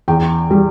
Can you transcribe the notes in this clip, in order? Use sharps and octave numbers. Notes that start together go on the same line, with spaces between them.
E2 G5
G3